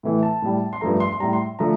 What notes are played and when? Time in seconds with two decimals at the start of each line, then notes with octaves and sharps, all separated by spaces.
0.03 A2 E3 A3
0.23 A5
0.42 A2 G3
0.73 C6
0.81 G2 F3 A3 A#5
1.00 C6
1.13 C6
1.20 A2 G3 A#5
1.33 C6
1.59 D3 F3 A3 A#5